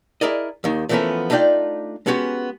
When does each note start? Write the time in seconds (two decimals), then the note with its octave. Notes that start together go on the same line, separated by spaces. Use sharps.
0.21 E4 G#4 A#4 D5 D#5
0.64 D#2 D#3
0.89 E3 F3 A3 B3 C#4 A#4
1.30 A3 D4 D#4 F4 D5 G5
2.06 G#3 B3 C#4 F#4 G4